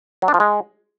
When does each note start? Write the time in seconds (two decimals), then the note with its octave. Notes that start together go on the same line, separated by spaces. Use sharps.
0.22 F#3
0.28 D4
0.34 F3
0.40 G#3